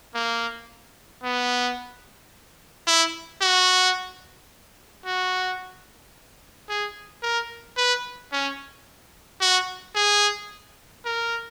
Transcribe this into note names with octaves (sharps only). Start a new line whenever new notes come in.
A#3
B3
E4
F#4
F#4
G#4
A#4
B4
C#4
F#4
G#4
A#4